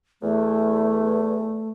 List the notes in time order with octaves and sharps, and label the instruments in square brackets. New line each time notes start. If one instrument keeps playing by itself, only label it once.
[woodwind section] E2 [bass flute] A3